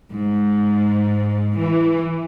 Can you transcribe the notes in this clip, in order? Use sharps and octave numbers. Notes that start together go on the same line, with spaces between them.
G#2
E3